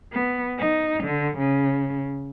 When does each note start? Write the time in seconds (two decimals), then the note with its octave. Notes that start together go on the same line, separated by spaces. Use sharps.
0.12 B3
0.59 D#4
1.03 D3
1.37 C#3